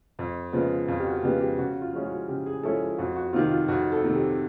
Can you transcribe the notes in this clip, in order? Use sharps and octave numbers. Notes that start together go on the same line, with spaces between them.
F2
C#3 F3 G#3 B3
F2 F4
G4
F#4
C#3 F3 G#3 B3 G4
G4
C#3 F#4
F4
F3 G#3 C#4 E4
F#4
C#3 G4
G#4
F3 G#3 C#4 E4 A4
G#4
F2 F#4
F#4
C3 D#3 F4
F4
F2 F#4
A4
C3 D#3
G4